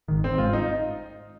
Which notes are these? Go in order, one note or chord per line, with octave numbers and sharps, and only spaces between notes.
G#1 G#2 D#3
C4
G#1 G#2 G#3 F4
D#4